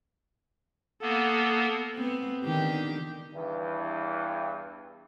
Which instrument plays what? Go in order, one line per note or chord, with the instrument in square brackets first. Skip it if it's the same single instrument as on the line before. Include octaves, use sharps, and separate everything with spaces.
[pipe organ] A#3 B3 [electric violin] A4
[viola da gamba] B3 C4
D3 D#3 G4
[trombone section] E2 G2 E3